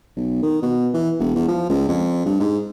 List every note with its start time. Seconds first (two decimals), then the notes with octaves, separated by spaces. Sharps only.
0.16 B1
0.43 D#3
0.62 B2
0.94 E3
1.20 E1
1.35 E2
1.48 F3
1.69 C#2
1.89 F2
2.26 G2
2.40 G#2